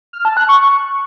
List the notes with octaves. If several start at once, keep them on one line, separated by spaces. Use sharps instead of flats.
F6
A5
F#6
C#6